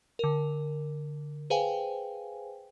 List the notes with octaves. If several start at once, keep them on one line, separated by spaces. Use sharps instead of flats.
D3 A#4
G#4 B4 C5 F5 G5 G#5